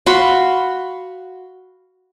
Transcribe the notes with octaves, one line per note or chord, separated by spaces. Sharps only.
F#4 F5 B5 C6